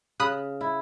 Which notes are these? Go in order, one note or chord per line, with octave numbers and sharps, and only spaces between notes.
C#3 B5 D#6 F#6
E4